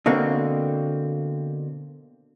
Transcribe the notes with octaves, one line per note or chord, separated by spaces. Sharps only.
B2 D3 A#3 C4